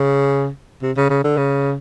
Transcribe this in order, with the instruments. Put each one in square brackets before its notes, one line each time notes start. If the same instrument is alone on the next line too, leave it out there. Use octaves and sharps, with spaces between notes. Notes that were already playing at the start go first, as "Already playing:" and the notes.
Already playing: [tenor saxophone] C#3
C3
C#3
C#3
D3
C#3